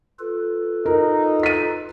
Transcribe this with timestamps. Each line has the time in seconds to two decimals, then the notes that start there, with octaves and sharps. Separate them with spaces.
0.19 F4 A4 B4
0.86 D#4 A#4
1.43 B6 D#7